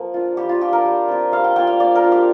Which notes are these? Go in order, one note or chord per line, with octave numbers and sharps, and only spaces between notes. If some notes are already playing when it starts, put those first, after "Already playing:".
Already playing: F3 A#3
D4 F4
G3 G4
F4
D4 F4 G4
A#4
G3
C4 F4
G3 F5
G5
A#3 F4 G5
F5
A#3 D5
A#4
D4 F4
G4